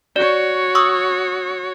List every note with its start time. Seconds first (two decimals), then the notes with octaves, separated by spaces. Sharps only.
0.16 F#4 C#5 D5
0.75 C#6 D#6 E6